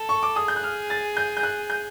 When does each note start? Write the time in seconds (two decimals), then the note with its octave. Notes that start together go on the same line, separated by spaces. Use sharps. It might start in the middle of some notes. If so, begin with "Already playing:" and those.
Already playing: A4
0.09 C#6
0.23 D6
0.36 G#4 D#6
0.48 G6
0.56 F#6
0.63 F6
0.90 A6
1.17 G6
1.37 G6
1.43 F#6
1.70 G6